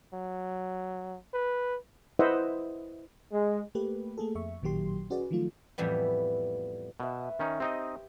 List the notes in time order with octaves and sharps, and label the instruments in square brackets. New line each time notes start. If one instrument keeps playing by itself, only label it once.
[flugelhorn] F#3
B4
[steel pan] E4 B4 C5 D#5 E5 F#5
[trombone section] G#3
[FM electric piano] A3 A#3 G4 B4
A3 A#3 G#4 A4
F2 E5 C#6
A1 A#2 D#3 F#3 G4 C6
C#4 F#4 G#4 B4 D5
D#3 F3 F#3 A3 F4
[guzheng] F2 A2 E3 G3 B3
[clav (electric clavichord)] B2 [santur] B4 E5
[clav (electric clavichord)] D#3 C#4 D#4
[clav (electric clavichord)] C4 D#4 D#5 [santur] G4